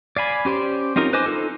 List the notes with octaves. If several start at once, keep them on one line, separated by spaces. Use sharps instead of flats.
D5 F5 G#5 B5
C#4 G4 C5 D5
C4 C#4 D#4 F4 A#4
B4 C5 D#5 G#5 D6
D#4 F4 A4